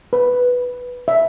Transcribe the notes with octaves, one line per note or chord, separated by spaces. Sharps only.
B4
E5